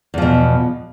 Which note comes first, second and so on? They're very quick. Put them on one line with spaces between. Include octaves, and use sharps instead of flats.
E2 F3 B2